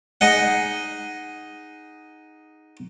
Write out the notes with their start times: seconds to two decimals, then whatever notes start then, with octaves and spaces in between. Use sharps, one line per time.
0.21 D#4 G#4 D#5 F#5